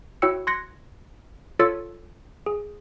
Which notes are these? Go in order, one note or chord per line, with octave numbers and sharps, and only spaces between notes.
E4 F#4 C#5 G5 E6 C#7
C6 F#6 G#6 A#6 C#7
F4 A4 C#5 E6 A6 C#7
G#4